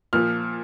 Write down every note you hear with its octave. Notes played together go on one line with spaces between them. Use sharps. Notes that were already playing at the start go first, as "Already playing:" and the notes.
A#2 F3 F6